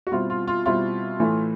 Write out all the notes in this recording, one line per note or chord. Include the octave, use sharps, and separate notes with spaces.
F#4
B2 G3 C4 E4 F4
F4
F4
B2 G3 C4 E4 F4
A2 E3 A3